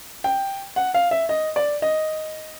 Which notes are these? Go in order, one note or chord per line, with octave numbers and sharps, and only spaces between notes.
G5
F#5
F5
E5
D#5
D5
D#5